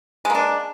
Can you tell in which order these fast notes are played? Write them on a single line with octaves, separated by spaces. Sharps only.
G#3 A#3 D4